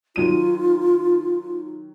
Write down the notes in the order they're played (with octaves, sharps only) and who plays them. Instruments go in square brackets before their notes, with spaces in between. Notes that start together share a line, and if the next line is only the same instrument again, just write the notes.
[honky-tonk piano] D#3 F#3 D#7 [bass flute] F4